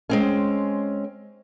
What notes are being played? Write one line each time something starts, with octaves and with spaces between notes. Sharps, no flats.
G#3 C4 C#4